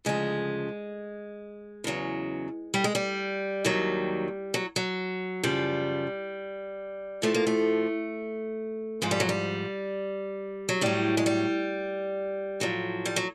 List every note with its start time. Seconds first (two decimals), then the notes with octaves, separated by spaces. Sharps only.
0.05 D2 C#3 F3 G#3
1.84 E2 C#3 F#3
2.74 G3
2.84 G#3
2.95 G3
3.65 D#2 D#3 F#3
4.54 F#3
4.76 F#3
5.44 F#2 C#3 F3 G3
7.22 A2 F3 A3
7.34 A#3
7.47 A3
9.02 G#2 F3 G#3
9.11 G3
9.20 F#3
9.29 G3
10.69 F#3
10.81 A2 F#3 G3
11.17 G#3
11.26 G3
12.60 A2 F3 F#3
13.06 G3
13.16 F#3